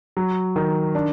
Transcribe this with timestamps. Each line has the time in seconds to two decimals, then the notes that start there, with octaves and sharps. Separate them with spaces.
0.17 F#3
0.56 D#3
0.95 D4